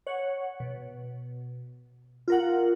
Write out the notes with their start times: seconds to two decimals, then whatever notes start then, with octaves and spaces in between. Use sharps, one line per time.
0.07 C#5 F#5
0.60 B2
2.28 F4 A#4 F#5